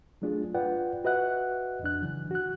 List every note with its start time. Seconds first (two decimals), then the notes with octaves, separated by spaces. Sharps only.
0.22 F#3 A3 D4 F4 G#4
0.54 F4 B4 D5 F#5 G5
1.04 F#4 B4 D#5 E5 F#5 F#6
1.83 F2 D4 F#6
2.02 C#3 E3 F#3
2.31 F#4 F#6